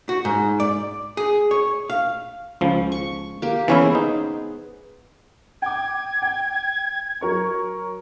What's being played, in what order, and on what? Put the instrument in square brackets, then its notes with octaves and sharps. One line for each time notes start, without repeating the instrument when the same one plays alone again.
[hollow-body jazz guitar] F#4
G#2
D5
G#4
C#5
F5
[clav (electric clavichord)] C#2 F3
[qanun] C#6
A#3 G4
[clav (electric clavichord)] E3 C#4 E4 [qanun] B3 G#4 C5
[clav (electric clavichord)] D#4
[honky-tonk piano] G5 D6 [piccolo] G#6
[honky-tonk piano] G5
F#3 A#4 C#6